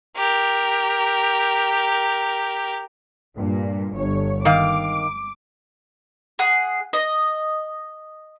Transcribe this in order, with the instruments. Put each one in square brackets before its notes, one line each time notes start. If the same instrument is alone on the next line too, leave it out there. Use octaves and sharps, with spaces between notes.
[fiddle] G4 A#4
[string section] G2 A#2
G1 C#5
[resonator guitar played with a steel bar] D#3 F5 [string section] D6
[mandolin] G#4 F#5
D#5